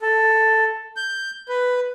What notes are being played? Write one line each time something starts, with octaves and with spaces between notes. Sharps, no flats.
A4
G6
B4